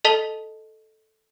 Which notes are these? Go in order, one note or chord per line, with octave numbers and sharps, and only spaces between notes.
A4 D#5 A5 B6 F7 G7